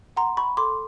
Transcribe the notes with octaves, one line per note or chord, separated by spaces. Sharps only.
F#5 A#5 C6
B5 C#6
A4 C6 D6